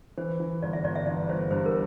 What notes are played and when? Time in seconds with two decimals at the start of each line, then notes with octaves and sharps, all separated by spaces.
0.18 E3 C5
0.40 E3
0.63 G1 D5
0.73 E5
0.84 G1 D5
0.95 E5
1.07 E3 D5
1.29 G1 C5
1.50 G2 C5
1.66 A#4